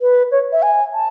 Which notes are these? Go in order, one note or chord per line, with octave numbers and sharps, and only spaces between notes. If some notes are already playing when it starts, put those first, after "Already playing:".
B4
C#5
E5
G#5
A5